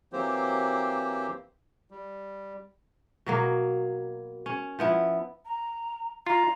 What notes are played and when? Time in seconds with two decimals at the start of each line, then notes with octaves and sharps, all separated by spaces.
0.13 E3 F#3 A#3 C4 G4 C5
1.91 G3
3.26 B2 F#3 A#3
4.46 C#4
4.79 F3 B3 E4
5.46 A#5
6.26 F4 A#5